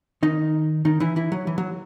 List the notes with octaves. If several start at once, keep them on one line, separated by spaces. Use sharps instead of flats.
D#3 D#4
D#3 D#4
E3 E4
E3 E4
F#3
E3
F#3